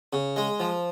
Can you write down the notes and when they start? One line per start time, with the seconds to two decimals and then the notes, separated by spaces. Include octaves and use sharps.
0.13 C#3
0.36 G#3
0.60 F3